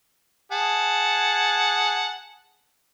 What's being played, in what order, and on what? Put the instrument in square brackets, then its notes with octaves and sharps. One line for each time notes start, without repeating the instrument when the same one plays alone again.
[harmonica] G#4 F#5 A5